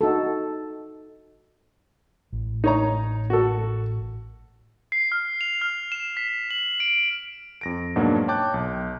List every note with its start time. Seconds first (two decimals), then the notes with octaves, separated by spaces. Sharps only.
0.01 D#4 F#4 A4
2.33 A1
2.64 D#4 C#5 A#5
3.30 F#4 A4
4.92 C7
5.12 F6
5.41 F7
5.61 F6
5.92 E7
6.17 B6
6.50 F#7
6.80 D7
7.61 F2 A#6 D7
7.96 G#2 B2 F#3 A#3 D4
8.28 C#5 G5 A5 D6 F#6 G6
8.54 B1